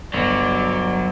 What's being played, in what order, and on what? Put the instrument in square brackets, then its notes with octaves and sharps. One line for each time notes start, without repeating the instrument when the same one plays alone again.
[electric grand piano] G1 [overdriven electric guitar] F#3 [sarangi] D5